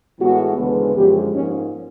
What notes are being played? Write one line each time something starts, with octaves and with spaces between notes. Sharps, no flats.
A2 E3 G#3 B3 F#4
D2 C#3 E3 G#3 B3
F#2 D3 F3 G#3 G4
G#2 F3 A#3 C#4